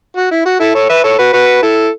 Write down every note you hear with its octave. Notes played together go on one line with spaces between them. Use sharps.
F#4
E4
F#4
E4 A4
A4 C#5
B4 E5
A4 C#5
F#4 B4
F#4 B4
E4 A4